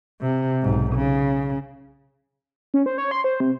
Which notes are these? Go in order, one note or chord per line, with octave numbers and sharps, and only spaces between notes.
C3
B1 G#2
C#3
C#4
C5
C#5
C6
C5
C3